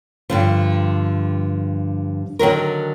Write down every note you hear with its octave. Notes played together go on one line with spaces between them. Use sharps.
G2 D3 F3
D3 D#3 F#3 A#4